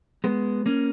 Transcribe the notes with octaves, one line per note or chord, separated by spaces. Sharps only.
G#3 B3
A#3 C#4